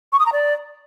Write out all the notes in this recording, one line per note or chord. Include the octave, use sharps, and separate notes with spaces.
C#6
D#6
A#5
D5